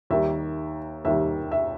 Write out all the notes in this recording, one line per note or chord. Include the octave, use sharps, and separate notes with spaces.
D#2 D#3 G3 E5
D#2 D#3 G3 E5
E5